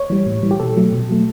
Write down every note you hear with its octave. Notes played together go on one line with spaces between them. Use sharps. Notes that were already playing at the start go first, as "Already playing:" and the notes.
Already playing: C#5
E3 G3
A2
E3 G3
G4
B2 A4
F#3 A3
B2
F#3 A3